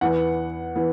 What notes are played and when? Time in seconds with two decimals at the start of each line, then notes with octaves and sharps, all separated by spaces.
0.01 E2 E3 B3 F#5
0.76 E3 B3